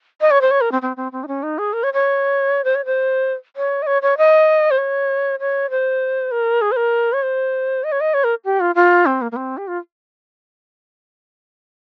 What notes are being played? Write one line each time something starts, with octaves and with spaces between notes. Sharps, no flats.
D#5
C#5
C5
C#5
A#4
C4
C4
C4
C4
D#4
C#4
D#4
G#4
A#4
C#5
C#5
C5
C#5
C5
C#5
D#5
C#5
C#5
D#5
C5
C#5
C#5
C5
A#4
G#4
C5
A#4
C#5
C5
D#5
C#5
D#5
C#5
A#4
G4
F4
F4
C4
A#3
A#3
C4
G4
F4